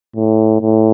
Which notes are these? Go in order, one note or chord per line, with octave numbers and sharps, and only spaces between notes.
A2
A2